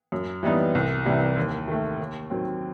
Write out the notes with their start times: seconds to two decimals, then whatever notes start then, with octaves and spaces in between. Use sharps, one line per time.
0.12 F#2
0.43 E3 G3 B3 D#4
0.75 C2
1.05 C3 E3 G3
1.36 D#2
1.68 D#3 A3
1.99 D#2
2.30 D#3 F#3 C4